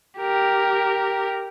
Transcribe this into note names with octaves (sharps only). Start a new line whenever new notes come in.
G4 A#4